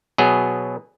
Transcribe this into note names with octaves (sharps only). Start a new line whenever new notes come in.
B2 F#3 B3 G#4